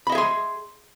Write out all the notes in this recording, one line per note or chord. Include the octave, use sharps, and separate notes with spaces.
G#4 D#5 E5 B5 C6